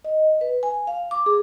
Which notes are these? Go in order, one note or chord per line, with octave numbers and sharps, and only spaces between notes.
D#5
B4
G#5
F5
D6
G#4